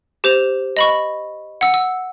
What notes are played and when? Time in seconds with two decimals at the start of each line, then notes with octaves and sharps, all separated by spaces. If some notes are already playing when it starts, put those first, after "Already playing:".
0.24 G4 C5 F7
0.77 D#5 B5 C#6
1.61 F#5 E6 C#7
1.74 E6